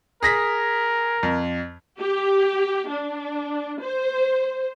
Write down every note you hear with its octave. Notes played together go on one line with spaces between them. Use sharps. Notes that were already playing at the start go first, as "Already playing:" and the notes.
G#4 A#4 A#6 B6
F2
G4
D4
C5